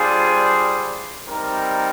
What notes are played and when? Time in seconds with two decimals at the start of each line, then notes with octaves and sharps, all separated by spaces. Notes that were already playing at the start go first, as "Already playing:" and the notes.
Already playing: G3 D4 F4 G#4 C5
1.27 G3 C4 D#4 A#4